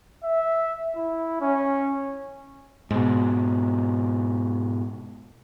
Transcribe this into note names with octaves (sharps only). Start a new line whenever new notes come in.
E5
E4
C#4
G#2 B2